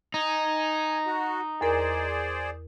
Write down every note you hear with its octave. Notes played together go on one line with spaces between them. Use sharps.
D#4 G#5
F#4
E2 G#4 A#4 C5 D5